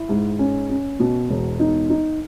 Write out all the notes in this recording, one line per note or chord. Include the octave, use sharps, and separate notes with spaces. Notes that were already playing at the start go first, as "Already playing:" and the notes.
Already playing: E4
G#2
C#4
C#4
B2
E1
D#4
D#4